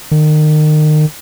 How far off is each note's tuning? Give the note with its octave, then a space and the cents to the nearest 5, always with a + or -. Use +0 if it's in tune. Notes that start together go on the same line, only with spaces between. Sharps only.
D#3 -30